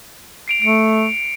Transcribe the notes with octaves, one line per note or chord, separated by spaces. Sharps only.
C7 D7 F7
A3 C#7 D7